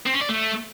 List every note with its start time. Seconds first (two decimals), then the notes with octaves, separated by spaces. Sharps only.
0.06 C4
0.14 C#4
0.21 D5
0.29 A3